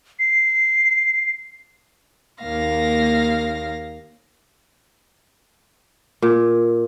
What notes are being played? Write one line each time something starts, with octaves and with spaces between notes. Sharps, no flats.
C7
D#2 A#3 F5 A#6
A#2